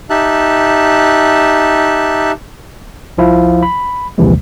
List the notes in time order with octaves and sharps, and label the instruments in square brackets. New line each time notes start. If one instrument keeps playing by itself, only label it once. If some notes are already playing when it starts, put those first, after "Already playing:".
[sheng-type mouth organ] D#4 G4 E5 A5 F#6
[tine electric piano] C2 F3 E4 F5
B5
A#1 D#2 C3 E3 F3 G#3